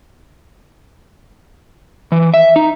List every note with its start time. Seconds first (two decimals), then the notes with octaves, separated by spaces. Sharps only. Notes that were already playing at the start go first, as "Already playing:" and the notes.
2.12 E3
2.34 E5
2.56 D#4